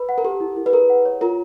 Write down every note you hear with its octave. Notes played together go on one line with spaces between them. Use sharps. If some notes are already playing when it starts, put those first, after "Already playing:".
Already playing: B4 B5
F#5
A#4
G4 A4
E4
E4
B4
G#4 A#4
F#5
C#5
F4 A#4